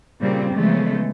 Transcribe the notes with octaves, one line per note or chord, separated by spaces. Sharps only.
A#2 C#3 G3 C4
C#3 E3 F3 G#3 A3 B3